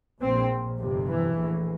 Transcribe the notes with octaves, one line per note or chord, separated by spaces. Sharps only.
A#1 A#2 C4
G1 F2 C3
E3
A#1 A2